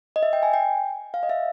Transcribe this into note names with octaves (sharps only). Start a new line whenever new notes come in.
D#5
E5
G5
G#5
G5
F5
D#5
E5